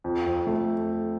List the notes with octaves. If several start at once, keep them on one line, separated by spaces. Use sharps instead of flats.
F2
F2
A3